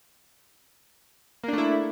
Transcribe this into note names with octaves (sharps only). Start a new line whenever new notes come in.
A3 A#3 D4 E4